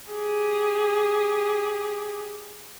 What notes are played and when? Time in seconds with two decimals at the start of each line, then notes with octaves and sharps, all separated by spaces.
0.11 G4 G#4